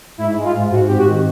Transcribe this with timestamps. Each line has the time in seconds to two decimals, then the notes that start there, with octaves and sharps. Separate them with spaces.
0.18 G#2 E4
0.36 G#3
0.44 F4
0.53 G#2
0.71 G#2 F#4
0.87 C4 G4
0.98 F#4
1.06 D#3